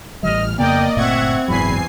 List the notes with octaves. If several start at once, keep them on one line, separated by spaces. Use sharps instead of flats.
A1 E3 G3 D#5 F6
F2 C#3 A#3 B3 D5 D#5 G5
G1 A#2 A3 C4 E5 F#5 C#6 G#6
F#1 E2 G#2 F#3 G#5 B5 C7